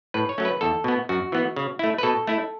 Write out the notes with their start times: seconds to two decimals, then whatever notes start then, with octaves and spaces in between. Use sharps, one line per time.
0.14 A2 B4
0.29 C#5
0.38 F#3 A3 C#4
0.45 B4
0.61 E2 A4
0.84 B2 B3
1.09 F#2 F#4
1.32 E3 B3
1.56 C#3
1.79 A3 E4
1.98 B4
2.03 B2 A4
2.27 A3 E4